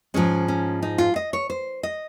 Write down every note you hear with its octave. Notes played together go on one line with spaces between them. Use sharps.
G#2 F3 G#3 C#4
C#4
D#4
F4
D#5
C#5
C5
D#5